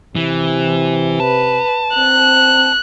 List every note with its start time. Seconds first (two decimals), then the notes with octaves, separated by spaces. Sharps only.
0.16 C3 E3
1.20 B4 A5
1.96 C4 F#6